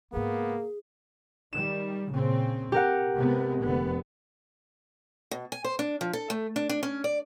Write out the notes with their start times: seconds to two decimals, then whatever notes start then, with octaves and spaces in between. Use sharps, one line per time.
0.13 G#2 C#3 A#3 B3 G#4
1.53 D#3 G3 E7
2.09 A#2 C#3 C4
2.72 C3 G4 A#4 F#5
3.15 C3 G#3 B3
3.60 F1 D3 B3
5.31 B2
5.52 G#5
5.64 C5
5.79 D4
6.01 F3
6.13 A4
6.30 A3
6.56 D4
6.69 D4
6.83 C#4
7.04 D5